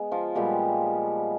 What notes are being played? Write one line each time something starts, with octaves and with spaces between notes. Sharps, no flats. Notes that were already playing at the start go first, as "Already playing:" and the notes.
Already playing: G#3 B3
F3 F4
A#2 F3 G3 G#3 B3 G4